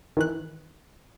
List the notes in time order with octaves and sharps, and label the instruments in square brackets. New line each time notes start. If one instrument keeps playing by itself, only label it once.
[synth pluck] D#3 E3 F#6